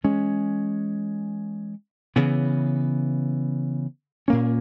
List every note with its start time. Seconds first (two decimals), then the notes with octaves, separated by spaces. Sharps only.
0.04 E3 G#3 C#4
2.16 C#3 E3 B3
4.28 A#2 A#3 C#4